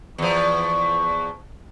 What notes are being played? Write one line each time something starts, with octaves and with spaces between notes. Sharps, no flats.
E2 F3 C#6